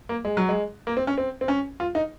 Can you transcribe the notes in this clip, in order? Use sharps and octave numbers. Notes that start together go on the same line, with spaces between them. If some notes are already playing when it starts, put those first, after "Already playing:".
A#3
G#3
F#3
G#3
A#3
C4
C#4
C4
C4
C#4
F4
D#4